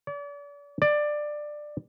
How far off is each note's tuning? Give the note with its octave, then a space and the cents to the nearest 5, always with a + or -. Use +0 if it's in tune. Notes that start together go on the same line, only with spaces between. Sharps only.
D5 -40
D5 +15